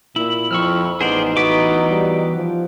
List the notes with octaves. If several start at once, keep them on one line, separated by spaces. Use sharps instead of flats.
A#2 E4
F2 F3 C#6 E6 F6
A1 B3 D#4 G#4 C5 D5
E3 B3 F#4 D6 B6
G3
F3